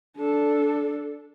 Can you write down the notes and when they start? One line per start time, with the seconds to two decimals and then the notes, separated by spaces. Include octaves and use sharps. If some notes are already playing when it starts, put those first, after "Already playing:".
0.16 D4 A4